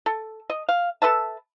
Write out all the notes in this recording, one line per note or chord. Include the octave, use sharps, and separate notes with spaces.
A4
D#5
F5
A4 B4 E5 A5